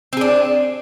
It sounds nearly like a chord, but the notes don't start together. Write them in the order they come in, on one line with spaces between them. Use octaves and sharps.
C4 G#4 D4